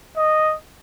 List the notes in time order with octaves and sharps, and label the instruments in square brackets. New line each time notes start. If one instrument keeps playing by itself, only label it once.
[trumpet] D#5